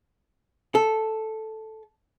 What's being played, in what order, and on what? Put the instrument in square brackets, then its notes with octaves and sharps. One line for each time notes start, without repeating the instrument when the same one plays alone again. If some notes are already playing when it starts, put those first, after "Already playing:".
[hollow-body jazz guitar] A4